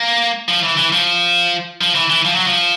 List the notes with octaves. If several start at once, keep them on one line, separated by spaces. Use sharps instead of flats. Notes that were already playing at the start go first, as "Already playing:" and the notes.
Already playing: A#3
F3
E3
E3
F3
F3
E3
E3
F3
F#3
F3